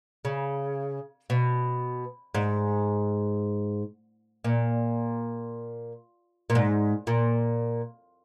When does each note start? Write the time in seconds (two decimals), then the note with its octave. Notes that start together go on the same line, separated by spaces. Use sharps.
0.25 C#3
1.30 B2
2.34 G#2
4.44 A#2
6.50 A#2
6.55 G#2
7.07 A#2